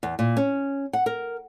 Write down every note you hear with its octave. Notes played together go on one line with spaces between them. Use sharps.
E2
A#2
C#4
F#5
A#4